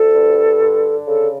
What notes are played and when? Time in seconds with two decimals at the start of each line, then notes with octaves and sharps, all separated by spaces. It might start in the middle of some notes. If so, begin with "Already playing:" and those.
Already playing: D2 A4
0.14 G2
0.60 D3
1.06 C#3 A4